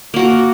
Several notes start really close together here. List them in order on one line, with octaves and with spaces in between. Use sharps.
A#3 F#4 A#4